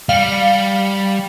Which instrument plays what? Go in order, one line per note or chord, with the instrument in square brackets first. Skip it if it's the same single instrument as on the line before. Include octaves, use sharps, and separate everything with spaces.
[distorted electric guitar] G3 [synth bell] F5 C#7